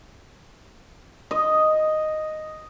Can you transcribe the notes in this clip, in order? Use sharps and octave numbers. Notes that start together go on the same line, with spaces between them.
D#5